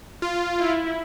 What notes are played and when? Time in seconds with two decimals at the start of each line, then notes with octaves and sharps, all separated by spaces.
0.22 F4
0.59 E4